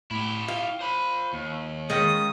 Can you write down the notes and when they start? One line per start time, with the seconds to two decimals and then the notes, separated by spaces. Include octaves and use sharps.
0.11 A2 E4 G4
0.48 F4 F5
0.81 C5 B5
1.33 D#2
1.90 D#3 G#3 C#4 F4 D#6 A#6